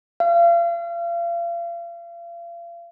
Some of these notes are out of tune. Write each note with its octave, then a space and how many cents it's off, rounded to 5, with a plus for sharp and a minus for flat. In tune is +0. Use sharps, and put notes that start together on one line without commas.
F5 -35